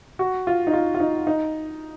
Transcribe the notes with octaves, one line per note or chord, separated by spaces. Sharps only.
F#4
F4
D#4
F4
F4
D#4
D#4